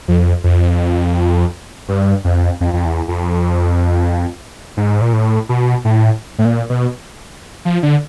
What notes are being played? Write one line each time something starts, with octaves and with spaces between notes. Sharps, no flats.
F2
F2
G2
F2
F2
F2
E2
F2
G#2
A#2
A2
B2
A2
A2
A#2
B2
F3
D3